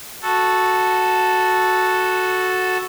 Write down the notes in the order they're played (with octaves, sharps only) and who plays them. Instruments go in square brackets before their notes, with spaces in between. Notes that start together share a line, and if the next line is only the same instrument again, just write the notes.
[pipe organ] F#4 A4